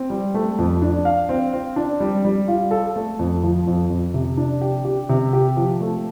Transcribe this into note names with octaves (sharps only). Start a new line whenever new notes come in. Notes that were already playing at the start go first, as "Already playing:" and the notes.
Already playing: C4
G3
A3
F2
D4
F5
C4
C4
D4
G3
G3
F4
A4
A3
F2
F3
F2
F2
C3
D4
G4
G4
C3
G4
F3
A3